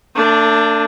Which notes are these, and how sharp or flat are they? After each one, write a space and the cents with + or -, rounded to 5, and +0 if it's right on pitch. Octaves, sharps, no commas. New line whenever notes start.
A3 +40 D4 +0